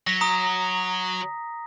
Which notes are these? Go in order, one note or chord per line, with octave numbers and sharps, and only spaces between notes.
F#3 A#6 B6
A#5 D#6